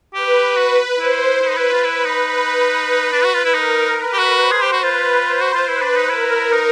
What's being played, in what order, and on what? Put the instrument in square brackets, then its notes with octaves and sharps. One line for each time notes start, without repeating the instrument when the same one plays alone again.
[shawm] G4 [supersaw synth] B4
[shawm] F#4 [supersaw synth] B4
[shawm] E4 [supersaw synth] C5
[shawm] E4 [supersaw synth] B4
[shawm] D#4
E4
F4
[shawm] E4 [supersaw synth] B4
[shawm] D#4
[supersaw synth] B4
[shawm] D4
F#4
F4
E4
[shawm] D#4 [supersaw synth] A#4
[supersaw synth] B4
[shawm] G4
F#4
[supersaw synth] C5
[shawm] G#4
G4
F#4
[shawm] F4 [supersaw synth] B4
[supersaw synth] C5
[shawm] F#4
F4
[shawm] E4 [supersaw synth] B4
[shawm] D4
D#4
[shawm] E4 [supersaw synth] A#4
[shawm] D#4